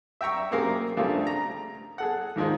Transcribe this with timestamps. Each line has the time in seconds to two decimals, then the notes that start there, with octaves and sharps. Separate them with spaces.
0.21 E5 G5 A#5 C#6 E6
0.51 F#2 C3 A#3 G#4 A#4 F5
0.97 G2 C#3 F3 G3 A3
1.27 A#5
1.98 G#4 A4 F#5
2.36 D#2 G#2 D#3 F3 G#3